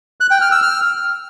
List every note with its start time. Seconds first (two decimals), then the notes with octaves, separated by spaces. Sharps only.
0.20 F#6
0.31 G5
0.41 F6
0.52 E6
0.62 F6